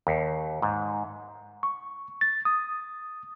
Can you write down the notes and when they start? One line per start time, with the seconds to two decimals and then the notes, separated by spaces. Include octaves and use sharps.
0.07 D#2
0.62 G#2
1.63 C#6
2.21 A6
2.45 D#6